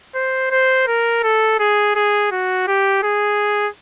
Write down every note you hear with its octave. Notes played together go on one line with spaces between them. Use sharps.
C5
C5
A#4
A4
G#4
G#4
F#4
G4
G#4